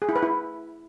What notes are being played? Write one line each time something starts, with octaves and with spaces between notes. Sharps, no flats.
G#4
E4
B4
E4